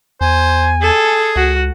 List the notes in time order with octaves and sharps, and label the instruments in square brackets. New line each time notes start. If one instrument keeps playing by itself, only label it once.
[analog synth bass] E2 [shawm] C5 [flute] G#5
[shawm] G#4 [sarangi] A4
[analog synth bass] C#2 [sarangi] F#4